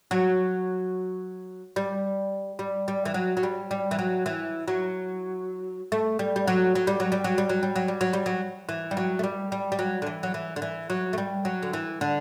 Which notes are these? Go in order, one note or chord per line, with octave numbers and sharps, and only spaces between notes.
F#3
G3
G3
G3
E3
F#3
F#3
G3
G3
E3
F#3
E3
F#3
A3
G3
G3
F#3
F#3
G3
F#3
G3
F#3
G3
F#3
G3
F#3
G3
F#3
G3
F#3
E3
G3
F#3
A3
G3
G3
G3
F#3
D3
E3
F#3
E3
D3
E3
F#3
A3
G3
F#3
D3
E3
D3